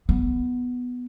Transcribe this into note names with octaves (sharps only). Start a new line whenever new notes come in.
B3